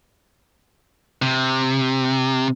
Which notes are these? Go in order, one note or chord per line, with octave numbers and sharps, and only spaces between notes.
C3